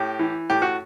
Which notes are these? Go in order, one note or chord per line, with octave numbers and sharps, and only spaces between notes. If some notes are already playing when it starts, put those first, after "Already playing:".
Already playing: A2 G4
E3
A2 G4
F#4